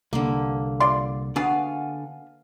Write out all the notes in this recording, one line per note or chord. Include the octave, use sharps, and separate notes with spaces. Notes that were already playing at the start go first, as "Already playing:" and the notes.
C2 D3 A#3
F4 D5 C6
D3 B3 D4 F#4 G#4 F5 G#5